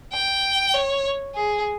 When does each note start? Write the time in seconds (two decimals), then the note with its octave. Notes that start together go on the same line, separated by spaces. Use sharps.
0.13 G5
0.74 C#5
1.35 G#4